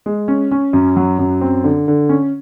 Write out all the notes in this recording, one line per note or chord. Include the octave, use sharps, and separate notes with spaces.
G#3
C#4
C#4
F#2
F#3
F#2
C4
D3
D3
C#4